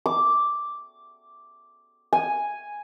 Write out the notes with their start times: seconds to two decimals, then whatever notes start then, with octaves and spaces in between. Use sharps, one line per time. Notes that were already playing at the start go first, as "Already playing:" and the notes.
0.06 D6
2.13 G#5